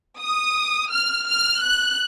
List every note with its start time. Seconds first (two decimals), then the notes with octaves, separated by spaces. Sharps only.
0.19 D#6
0.91 F6
1.27 F6
1.64 F#6